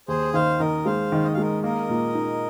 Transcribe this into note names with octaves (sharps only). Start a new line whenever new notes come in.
D#2 G#4 C5
D#3 C5 F5
D#3 A#4 D#5
G#3 C5 F5
D#3
D#5
F5
G#3 A#4 D#5
A#3 A#4 D#5
A#2
D#4